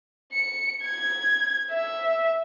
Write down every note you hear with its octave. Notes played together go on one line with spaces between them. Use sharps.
C#7
G#6
E5